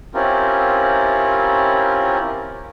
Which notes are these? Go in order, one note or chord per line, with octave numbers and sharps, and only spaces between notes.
C4 C#4 E4 F4 G4 A#4